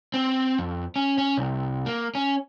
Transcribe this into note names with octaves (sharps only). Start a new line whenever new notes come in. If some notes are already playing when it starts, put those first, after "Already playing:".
C4
F2
C#4
C#4
C2
A#3
C#4